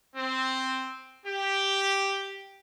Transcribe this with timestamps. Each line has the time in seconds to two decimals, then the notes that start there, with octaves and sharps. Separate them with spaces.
0.16 C4
1.26 G4